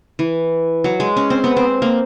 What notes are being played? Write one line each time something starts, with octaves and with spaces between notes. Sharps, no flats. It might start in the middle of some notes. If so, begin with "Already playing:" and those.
E3
F#3
G#3
C#4
C4
B3
C4
A#3